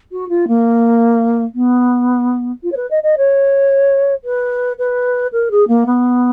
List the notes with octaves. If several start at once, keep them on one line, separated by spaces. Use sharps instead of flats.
F#4
F4
A#3
B3
F4
C#5
B4
D#5
D#5
C#5
B4
B4
A#4
G#4
A#3
B3